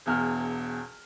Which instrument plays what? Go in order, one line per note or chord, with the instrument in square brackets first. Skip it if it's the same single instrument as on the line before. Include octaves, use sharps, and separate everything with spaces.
[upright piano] E1 E2 F6